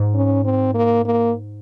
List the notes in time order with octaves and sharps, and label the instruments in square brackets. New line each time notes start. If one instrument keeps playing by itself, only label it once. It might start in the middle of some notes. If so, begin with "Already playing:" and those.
Already playing: [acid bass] G#2
[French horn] C#4
C4
A#3
A#3